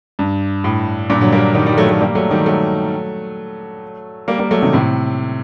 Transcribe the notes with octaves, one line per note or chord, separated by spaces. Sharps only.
G2
A2
G2 A#2
D3 F#3
G3 A#3
D#3 G3
D#3 G3
F#3 A3
F#3 A3
G3 A#3
F#3 A3
D#3 G3
F#3 A3
G3 A#3
G3 A#3
F#3 A3
C3 D#3
A2 C3